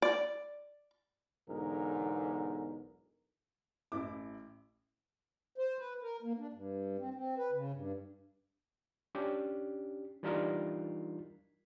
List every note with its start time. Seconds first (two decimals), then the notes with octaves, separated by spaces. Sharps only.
0.02 D5
1.48 B1 E2 G#2 D3 A#4
3.92 A1 E4 D6
5.58 C5
5.78 B4
6.02 A#4
6.23 A#3
6.38 D4
6.53 G2
6.99 C4
7.14 C4
7.38 B4
7.52 C#3
7.73 G2
9.15 C#4 D4 G4
10.23 E3 G3 D4 D#4 F4 A#4